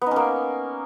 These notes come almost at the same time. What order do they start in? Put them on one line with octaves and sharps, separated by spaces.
B3 D#4 C#4 A#3